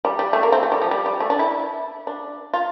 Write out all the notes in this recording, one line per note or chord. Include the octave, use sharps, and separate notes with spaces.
G3
G3
A3
A#3
C4
A3
G3
F3
G3
G3
A3
D4
E4
D4
F4